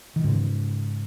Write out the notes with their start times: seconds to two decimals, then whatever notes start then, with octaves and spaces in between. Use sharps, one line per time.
0.16 D#3
0.24 G#2 C#3